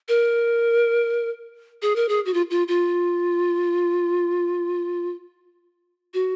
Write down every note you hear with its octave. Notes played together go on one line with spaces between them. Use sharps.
A#4
G#4
A#4
G#4
F#4
F4
F4
F4
F#4